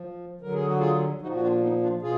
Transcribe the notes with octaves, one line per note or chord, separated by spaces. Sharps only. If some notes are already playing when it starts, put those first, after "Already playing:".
Already playing: F3
D3 F#3 A#4
G#4
F#4
F4 G#4
A#2 F3 D#4 F#4
F#4
D4 F4
B3 D#4
D4 F4
B2 F4 G#4